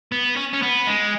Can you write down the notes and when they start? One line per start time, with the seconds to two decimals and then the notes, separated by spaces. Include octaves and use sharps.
0.12 B3
0.36 C#4
0.53 C#4
0.62 B3
0.86 G#3